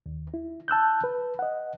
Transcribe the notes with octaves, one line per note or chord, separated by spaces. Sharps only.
D#2
E4
A5 E6 F#6 G6
B4
D#5 F#5